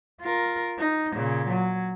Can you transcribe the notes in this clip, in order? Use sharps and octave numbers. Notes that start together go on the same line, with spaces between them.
F4 A#4
D#4
A#2 C#3
F#3